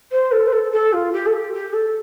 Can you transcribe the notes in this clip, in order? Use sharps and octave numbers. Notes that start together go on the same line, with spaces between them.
C5
A4
C5
A4
A4
F4
G4
A4
G4
G4
A4